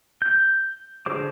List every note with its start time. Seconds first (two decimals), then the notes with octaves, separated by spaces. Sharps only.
0.22 G6
1.06 D3 G#4 C5 D6